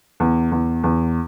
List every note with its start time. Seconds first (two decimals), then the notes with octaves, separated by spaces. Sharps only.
0.20 E2
0.52 E2
0.84 E2